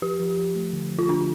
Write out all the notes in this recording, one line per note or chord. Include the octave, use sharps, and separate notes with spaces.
F3 G4
F3
F3
A3
D3
F3
F4
D3 D4